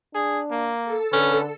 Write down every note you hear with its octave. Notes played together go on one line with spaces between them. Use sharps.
D4 G#4
A#3
A4
D3 C#4 B4